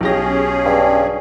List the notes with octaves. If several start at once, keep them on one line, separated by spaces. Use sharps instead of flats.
B1 C#4 G4 G#4 A#6
G2